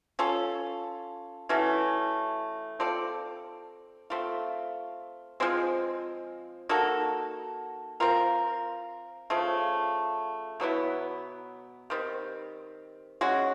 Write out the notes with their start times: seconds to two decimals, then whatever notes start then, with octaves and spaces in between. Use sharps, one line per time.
0.19 C#4 F4 A4
1.49 E3 A3 C#4 F#4
2.80 C4 F4 A4 D5
4.10 A3 C4 F4
5.40 F3 G#3 C4
6.69 A#3 D#4 F#4 A4
8.00 C4 F4 A#4
9.30 C#3 F3 A3
10.60 B2 F#3 B3 E4
11.90 D#3 G3 C4
13.21 G#3 C#4 F#4